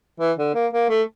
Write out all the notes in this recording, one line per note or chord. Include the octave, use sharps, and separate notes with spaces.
E3
D3
A#3
A#3
A3